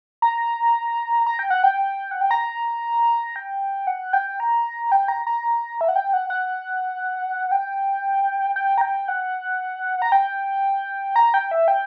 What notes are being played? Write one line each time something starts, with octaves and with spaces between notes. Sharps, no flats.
A#5
A#5
G5
F#5
G5
F#5
G5
A#5
G5
F#5
G5
A#5
G5
A#5
A#5
E5
F#5
G5
F#5
F#5
G5
G5
A#5
G5
F#5
A#5
G5
A#5
G5
E5
G5